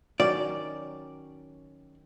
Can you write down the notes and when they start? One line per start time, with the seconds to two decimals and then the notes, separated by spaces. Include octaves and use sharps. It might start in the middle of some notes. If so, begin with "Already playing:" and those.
0.20 D#3 F#3 C#4 D5